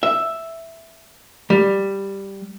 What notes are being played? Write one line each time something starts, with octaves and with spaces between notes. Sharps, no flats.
E5
G3